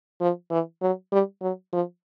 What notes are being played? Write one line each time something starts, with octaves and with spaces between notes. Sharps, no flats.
F3
E3
F#3
G3
F#3
F3